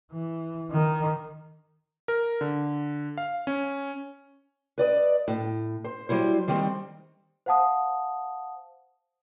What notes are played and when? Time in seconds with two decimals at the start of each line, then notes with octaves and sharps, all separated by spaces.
0.12 E3
0.71 D#3
2.08 A#4
2.41 D3
3.18 F5
3.47 C#4
4.78 B4 D5 D#5
5.28 A2
5.85 C5
6.09 F#3 G3 E4 C5
6.48 D#3 G3 C4
7.46 C5 F5 F#5 A5 D#6